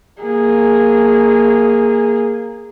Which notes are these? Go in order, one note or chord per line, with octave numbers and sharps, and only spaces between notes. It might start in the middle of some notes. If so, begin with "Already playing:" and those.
A#3 G#4